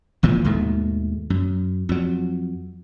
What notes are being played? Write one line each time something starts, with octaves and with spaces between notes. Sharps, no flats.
G#1 A#2 E3 F3
D#2 G#2 B2 A3
F#2
F2 F#3